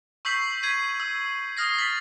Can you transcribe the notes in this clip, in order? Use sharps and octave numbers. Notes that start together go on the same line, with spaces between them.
C#6 E6 G6 B6 C7 F#7
G#6 B6 C7 D#7
E6
D#6 F6 A#6 C7
A6 B6 C7 F#7